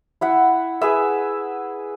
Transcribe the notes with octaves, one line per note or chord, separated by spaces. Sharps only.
E4 E5 F#5
G#4 B4 E5